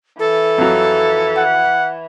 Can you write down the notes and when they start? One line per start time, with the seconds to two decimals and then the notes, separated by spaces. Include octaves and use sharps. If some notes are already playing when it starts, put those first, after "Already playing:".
0.19 E3 A4
0.58 F2 F#3
1.37 F#5